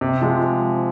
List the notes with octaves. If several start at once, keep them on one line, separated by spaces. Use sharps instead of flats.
C3
F3 G#3